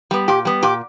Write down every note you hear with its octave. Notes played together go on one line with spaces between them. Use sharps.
G3 B3
A#2 G4
G3 B3
A#2 G4